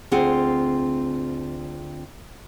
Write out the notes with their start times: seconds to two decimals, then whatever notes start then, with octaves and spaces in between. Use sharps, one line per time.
0.11 D2 C4 F4 G#4 F#5